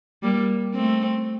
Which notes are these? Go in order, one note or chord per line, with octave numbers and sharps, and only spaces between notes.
G3 A#3
A3 C4